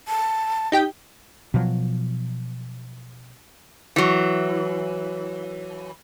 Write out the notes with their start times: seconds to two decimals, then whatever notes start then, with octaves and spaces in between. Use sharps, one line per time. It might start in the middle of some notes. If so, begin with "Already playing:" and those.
0.08 A5
0.72 D#4 G4 G5
1.54 B2 F3 F#3
3.96 E3 F#3